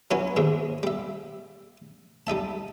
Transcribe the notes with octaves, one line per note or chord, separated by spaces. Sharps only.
F#3 C#4 E4 B4 C#5
D#2 G#2 E5
G3 E5
G3 D#4 E5 A5